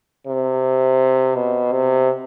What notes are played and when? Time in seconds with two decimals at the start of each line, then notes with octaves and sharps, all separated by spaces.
0.27 C3
1.35 B2
1.72 C3